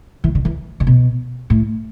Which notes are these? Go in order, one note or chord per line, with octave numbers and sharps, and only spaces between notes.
E3
D3
E3
D3
B2
A2